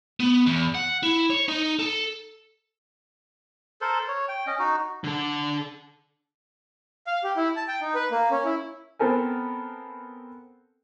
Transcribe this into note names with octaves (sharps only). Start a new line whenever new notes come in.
B3
E2
F#5
E4
C#5
D#4
A4
A4 A#4 C5
C#5
G5
C#4 D#5
D#4 F#4
D3 A4
F5
G4
E4
A5
G5
D#4
B4
A#3
C#4
E4
B3 C4 A4 A#4 G#5